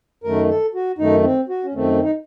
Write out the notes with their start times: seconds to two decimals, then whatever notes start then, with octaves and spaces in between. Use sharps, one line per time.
0.24 F#2 D#3 A3 A#4
0.49 A4
0.74 F#4
0.98 F#2 D#3 A3 D#4
1.24 C4
1.49 F#4
1.64 C#4
1.74 F#2 D#3 A3 C4
2.03 D#4